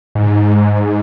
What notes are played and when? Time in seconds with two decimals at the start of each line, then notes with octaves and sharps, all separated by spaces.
0.15 G#2